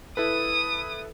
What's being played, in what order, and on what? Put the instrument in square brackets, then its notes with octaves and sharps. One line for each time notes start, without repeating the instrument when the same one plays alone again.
[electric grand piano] E4 A4 B4 [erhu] D#6